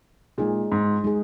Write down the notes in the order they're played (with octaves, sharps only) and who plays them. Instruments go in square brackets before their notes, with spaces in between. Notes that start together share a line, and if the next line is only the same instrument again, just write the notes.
[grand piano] A#2 [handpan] G#3 D#4 G#4
[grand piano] G#2
[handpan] G#3 D#4 G#4